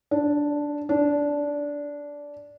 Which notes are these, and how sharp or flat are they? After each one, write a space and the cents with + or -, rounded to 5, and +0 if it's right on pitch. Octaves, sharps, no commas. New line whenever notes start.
D4 -5
D4 -15